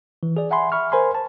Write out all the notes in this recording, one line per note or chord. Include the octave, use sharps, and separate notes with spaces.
E3
G#4 D5
E5 F#5 G#5 B5 C6
E5 B5 C#6 F6
A#4 C5 G#5 B5 C6
A5